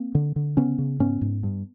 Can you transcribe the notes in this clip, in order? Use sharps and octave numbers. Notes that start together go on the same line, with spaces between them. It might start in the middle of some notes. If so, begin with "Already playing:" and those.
Already playing: A#3 C4
D3
D3
C#3 B3 C#4
C#3
G#2 B3 C#4
G#2
G2